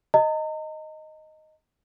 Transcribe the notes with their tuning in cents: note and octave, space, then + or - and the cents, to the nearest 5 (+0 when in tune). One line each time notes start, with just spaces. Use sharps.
D#5 +0 A#5 -40